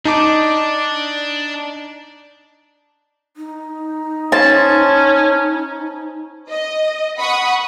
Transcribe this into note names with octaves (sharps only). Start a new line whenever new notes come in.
D4 D#4 A5 D6
D#4
C#4 C5 A5
D#5
F#5 B5 C#6 D#6